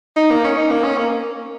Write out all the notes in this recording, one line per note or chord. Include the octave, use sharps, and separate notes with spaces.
D#4
A#3
C#4
D#4
A#3
C#4
A#3